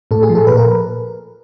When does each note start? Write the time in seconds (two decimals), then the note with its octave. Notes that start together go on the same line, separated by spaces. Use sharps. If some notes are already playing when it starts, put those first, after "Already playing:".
0.11 A2 A4
0.23 G#4
0.29 F3
0.35 A4
0.47 A#2 B4
0.57 A#4